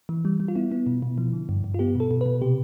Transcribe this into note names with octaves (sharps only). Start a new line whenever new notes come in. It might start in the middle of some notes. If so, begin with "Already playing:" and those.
E3
G3
G3
F4
B3 E4
B3
B2
B2
F3
D3
G2
G2
F4
B3 G4
B2 A4
B2
B2 B4
C3 G4